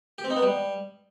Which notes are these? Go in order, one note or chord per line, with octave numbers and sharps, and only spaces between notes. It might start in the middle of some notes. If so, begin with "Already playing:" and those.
G4
C4
D#4
B3
G3